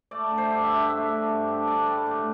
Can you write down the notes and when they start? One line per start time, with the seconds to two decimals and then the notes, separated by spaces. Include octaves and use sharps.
0.11 A3 D5
0.31 D3
0.38 C5
0.50 G2
0.63 E5
0.70 D4
0.89 A3 E5
1.09 D3
1.29 G2
1.48 D4
1.67 D4 D5
1.87 G3
2.06 A2